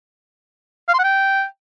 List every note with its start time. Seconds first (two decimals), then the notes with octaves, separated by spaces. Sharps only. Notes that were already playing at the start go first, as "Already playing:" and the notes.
0.89 F5
0.94 C6
0.99 F#5
1.04 G5